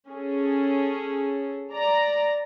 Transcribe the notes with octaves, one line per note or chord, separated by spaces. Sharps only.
C#4 G#4 A4
D5 A#5